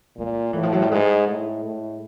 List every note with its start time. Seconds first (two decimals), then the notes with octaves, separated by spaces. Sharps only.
0.18 A#2 G#3
0.53 A2 E3
0.63 F3
0.72 F#3
0.82 G3
0.92 G#2 G#3
1.27 A2
1.64 A2